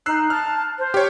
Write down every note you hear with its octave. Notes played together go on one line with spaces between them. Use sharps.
D#4 E6 F#6 C7
A5 F6
C5
G4 C#5